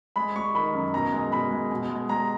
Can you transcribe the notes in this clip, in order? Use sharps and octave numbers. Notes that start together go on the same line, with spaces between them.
G#3 B5
G#3 C#6
D#3 B5
F#2
B2 A#5
G#3
B2 B5
G#3
B2
G#3
G#3 A#5